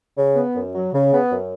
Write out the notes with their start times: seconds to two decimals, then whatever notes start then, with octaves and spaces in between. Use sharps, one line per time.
0.17 C#3
0.36 B3
0.55 F#2
0.74 F#3
0.93 C#3
1.12 B3
1.31 F#2